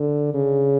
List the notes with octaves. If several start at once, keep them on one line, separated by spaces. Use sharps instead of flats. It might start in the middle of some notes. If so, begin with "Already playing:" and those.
Already playing: D3
C#3